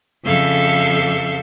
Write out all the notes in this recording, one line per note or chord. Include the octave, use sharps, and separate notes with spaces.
F2 C#3 A4 E5 F5 G6